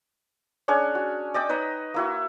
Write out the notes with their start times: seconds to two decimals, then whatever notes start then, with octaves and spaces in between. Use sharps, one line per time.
0.68 C#4 D4 G#4 C#5
0.95 F#4
1.34 D5 D#5 G5 D6
1.49 D#4 B4 C#5 D#5
1.94 A#3 E4 F#4